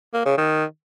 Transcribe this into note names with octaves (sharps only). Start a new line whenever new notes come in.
A#3
C#3
D#3